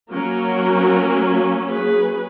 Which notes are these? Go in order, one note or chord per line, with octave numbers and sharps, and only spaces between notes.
F#3 A#3 C#4 F#4 A#4
G#4 B4